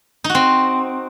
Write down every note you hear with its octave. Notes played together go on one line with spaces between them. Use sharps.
D#4
F#4
C4